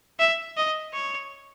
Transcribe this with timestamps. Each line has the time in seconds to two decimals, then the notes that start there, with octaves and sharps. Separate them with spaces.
0.19 E5
0.57 D#5
0.93 C#5